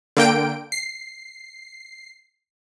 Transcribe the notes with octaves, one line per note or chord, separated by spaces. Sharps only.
D3 A#3 G5 D7
C7